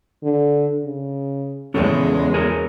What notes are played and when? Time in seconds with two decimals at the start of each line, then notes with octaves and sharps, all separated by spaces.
0.23 D3
0.85 C#3
1.74 E2 C#3 G#3 C#4 A4 C#5
2.34 G#4 A#4 C#5